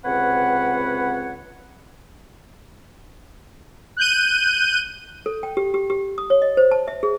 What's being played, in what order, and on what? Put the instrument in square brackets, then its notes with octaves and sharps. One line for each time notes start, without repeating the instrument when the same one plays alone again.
[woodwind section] C#2 C3 C4 B4 C#5 F#5
[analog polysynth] F#6 G6 D#7
[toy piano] A4
G5
G4
G4
G4
D#6
C#5
D#5
C5
A5
E5
G#4